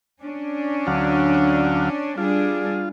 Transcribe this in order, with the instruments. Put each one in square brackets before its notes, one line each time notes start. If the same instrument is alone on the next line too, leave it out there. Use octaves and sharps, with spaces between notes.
[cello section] C#4 D4
[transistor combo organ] D2 F#3 F5
[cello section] G3 D4 G#4 [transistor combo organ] F4